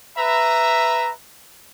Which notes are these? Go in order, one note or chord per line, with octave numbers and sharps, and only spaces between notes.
B4 E5 A#5